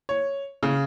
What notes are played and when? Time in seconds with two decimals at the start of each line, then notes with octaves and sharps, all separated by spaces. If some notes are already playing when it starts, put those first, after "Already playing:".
0.09 C#5
0.63 C#3